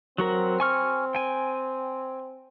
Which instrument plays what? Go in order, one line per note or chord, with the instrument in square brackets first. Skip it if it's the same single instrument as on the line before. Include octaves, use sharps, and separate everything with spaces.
[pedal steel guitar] F#3 F#4 A#4 [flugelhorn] C4
[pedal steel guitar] G#5 C#6 F6
G5 G#5